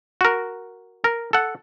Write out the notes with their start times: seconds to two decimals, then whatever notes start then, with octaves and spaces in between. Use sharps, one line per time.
0.21 F#4 A#4
1.04 A#4
1.33 A4 F#5